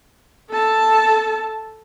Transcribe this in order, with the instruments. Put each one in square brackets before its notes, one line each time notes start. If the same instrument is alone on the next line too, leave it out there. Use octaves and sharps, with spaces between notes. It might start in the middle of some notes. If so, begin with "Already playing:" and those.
[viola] A4 A5